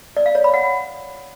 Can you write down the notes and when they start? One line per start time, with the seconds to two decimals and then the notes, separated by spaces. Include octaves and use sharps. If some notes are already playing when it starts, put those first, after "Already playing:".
0.17 D5
0.26 F5
0.35 C#5
0.44 B5
0.54 F#5